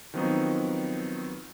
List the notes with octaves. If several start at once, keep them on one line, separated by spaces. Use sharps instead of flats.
D#3 F3 F#3 B3 C4 D#4